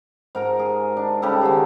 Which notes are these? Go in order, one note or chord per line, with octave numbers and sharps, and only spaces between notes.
G#2 A#4 A#5
G#4
D4
C#3 G3 G4 A4
D#3 F#4 G#4 C5